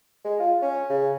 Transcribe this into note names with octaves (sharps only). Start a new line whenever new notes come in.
G#3
F4
C#4
C#3